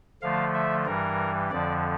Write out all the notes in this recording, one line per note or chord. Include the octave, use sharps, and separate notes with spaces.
D3 F3 A3 F5
E5
G2 E3 G3 A#4
F2 D3 F3 D5